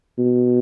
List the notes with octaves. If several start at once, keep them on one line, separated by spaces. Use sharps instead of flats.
B2